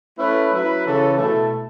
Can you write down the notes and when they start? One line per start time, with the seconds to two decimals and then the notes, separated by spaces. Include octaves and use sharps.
0.19 A3 C#4 E4 B4
0.52 F#3 C#4 E4 B4
0.85 C#3 E3 C#4 A4
1.18 B2 A3 E4 A4